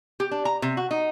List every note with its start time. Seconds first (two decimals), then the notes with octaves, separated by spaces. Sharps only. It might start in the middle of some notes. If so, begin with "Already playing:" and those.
0.20 G4
0.31 D4
0.45 A#5
0.62 C3
0.77 F#4
0.91 D#4